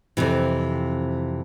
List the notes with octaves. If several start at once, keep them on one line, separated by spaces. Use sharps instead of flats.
F2 C3 E3